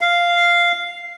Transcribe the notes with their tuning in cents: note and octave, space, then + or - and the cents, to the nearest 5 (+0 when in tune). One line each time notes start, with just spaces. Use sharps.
F5 -5